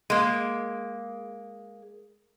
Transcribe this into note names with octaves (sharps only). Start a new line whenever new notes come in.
G#3 A#3